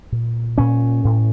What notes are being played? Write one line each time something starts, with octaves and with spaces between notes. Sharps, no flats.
A#2
A#2 C#4
A2